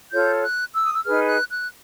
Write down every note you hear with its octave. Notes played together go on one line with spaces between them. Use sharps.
F4 A4 C#5 G6
F#6
E6
D#6
E6
D#4 G#4 B4 F6
F#6
F#6